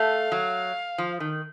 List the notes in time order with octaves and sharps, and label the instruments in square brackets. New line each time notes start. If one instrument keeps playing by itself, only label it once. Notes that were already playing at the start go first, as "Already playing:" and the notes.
Already playing: [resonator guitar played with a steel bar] A3 [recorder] F5
[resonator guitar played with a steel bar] F#3
F3
D#3